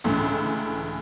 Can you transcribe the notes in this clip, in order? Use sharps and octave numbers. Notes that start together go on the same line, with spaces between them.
C#2 A2 D3 E3